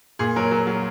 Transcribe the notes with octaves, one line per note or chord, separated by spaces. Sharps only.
A#2 G#4
F#3 A#4
F#3
F#3